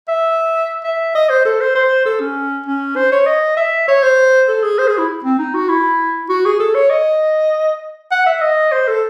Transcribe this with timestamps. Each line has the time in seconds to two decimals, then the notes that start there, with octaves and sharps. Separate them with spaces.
0.09 E5
0.84 E5
1.15 D#5
1.29 C5
1.45 A4
1.61 C5
1.75 C5
2.06 A4
2.20 C#4
2.66 C#4
2.96 C5
3.12 C#5
3.26 D#5
3.57 E5
3.88 C#5
4.03 C5
4.49 A4
4.63 G#4
4.79 C5
4.88 G#4
4.98 E4
5.24 C4
5.39 D#4
5.54 F#4
5.69 E4
6.29 F#4
6.45 G#4
6.59 A4
6.75 C#5
6.90 D#5
8.11 F#5
8.26 E5
8.41 D#5
8.72 C5
8.88 A4